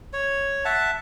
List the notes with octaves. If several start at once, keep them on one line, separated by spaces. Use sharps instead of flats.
C#5
E5 F#5 A5